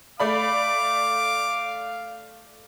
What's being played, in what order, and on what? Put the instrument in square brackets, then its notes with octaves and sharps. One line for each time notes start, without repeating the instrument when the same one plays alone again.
[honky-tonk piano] A3 D5 B5 [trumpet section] F5 [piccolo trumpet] D6